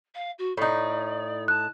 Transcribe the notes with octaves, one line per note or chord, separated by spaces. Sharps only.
F5
F#4
A2 D#4 D5
A5 F#6